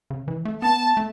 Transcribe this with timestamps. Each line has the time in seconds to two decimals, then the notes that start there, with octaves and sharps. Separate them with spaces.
0.10 C#3
0.28 E3
0.45 A3
0.62 B3 A5
0.97 A3